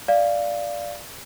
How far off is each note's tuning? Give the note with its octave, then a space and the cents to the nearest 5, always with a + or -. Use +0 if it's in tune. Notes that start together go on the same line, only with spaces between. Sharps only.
D5 +0 F5 -10